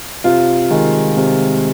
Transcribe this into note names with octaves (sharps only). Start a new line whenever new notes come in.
C3 F4
D#3 G#3
C3